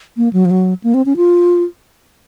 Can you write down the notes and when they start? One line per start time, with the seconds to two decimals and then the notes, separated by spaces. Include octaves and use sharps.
0.17 A#3
0.33 F#3
0.45 F3
0.51 F#3
0.84 A#3
0.94 C4
1.06 C#4
1.17 F4